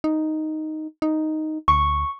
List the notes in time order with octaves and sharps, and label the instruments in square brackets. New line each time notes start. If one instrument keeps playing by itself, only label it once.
[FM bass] D#4
D#4
[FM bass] D2 [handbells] C#6